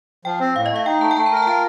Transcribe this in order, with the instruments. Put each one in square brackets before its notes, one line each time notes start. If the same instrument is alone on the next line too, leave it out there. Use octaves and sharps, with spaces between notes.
[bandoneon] F3 [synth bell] G5
[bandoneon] C4
[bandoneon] A2 [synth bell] F5
[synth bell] D#5
[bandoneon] A3 [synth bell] F5
[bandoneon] D#4 [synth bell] G5
[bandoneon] A3 [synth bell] A5
[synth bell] G5
[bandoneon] A3 [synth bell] A5
[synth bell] A#5
[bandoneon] A#4 [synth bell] A5
[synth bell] G5
[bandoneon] F4 [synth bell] A5